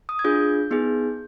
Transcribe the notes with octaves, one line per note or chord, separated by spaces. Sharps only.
D#6
G#6
D4 F4 G#4 G6
B3 D#4 G#4